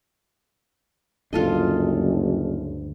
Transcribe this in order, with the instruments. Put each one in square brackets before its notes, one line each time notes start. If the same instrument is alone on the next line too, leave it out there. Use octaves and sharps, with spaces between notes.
[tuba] F#1 [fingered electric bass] D2 G2 [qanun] F4 A4 D#5